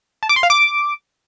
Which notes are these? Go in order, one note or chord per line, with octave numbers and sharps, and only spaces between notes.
A5
D6
C6
F5
D6